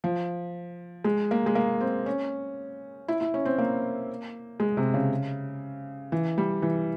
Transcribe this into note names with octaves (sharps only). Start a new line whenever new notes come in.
F3
G#3
A#3
G#3
A#3
C4
C#4
E4
E4
C#4
C4
A#3
G#3
C3
C#3
E3
G3
E3